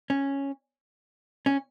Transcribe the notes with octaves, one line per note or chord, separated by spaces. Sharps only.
C#4
C#4